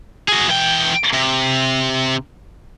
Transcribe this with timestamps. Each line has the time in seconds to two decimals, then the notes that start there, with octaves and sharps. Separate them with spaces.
0.29 F#4 G#4
0.49 E3 G5
1.13 C3